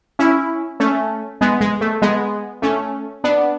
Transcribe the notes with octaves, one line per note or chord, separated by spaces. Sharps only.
C#4 E4
A3 C#4
G#3 B3
G#3
A3
G#3 B3
A3 C#4
B3 D4